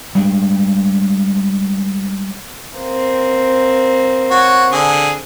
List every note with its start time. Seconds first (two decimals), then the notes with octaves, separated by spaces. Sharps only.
0.15 G3 G#3 D4
2.78 A#3 C4
4.31 F#4 C#5
4.72 D3 G#4